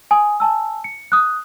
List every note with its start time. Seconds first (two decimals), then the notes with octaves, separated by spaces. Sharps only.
0.11 G#5 D#6
0.40 G#5 A5 E6
0.84 C#7
1.12 D#6 F#6